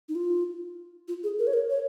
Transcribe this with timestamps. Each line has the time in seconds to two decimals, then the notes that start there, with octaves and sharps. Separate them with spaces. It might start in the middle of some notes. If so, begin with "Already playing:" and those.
0.09 D#4
0.15 F4
1.08 F4
1.24 G#4
1.39 A#4
1.47 C#5
1.54 A#4
1.70 C#5